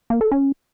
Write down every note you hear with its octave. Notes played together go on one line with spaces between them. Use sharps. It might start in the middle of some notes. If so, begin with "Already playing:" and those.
A#3
A4
C#4